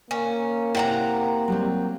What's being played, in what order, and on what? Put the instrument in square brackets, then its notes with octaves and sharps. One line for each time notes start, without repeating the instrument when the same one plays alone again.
[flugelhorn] A#3 [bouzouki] C#4
[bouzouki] C3 F#5 A#5 [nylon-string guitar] E4 G5
[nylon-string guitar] F#3 G3 C4